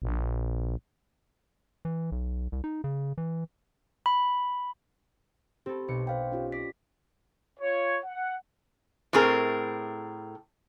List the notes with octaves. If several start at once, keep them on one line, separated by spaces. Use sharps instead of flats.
A#1
E3
B1
C2
D#4
C#3
E3
B5
C4 G4 A4 B5
B1 C#7
C5 F5 G5
C#4 F4 G4
D5 A#6 B6
F4 C#5
F#5
A2 A3 C4 G#4 A#4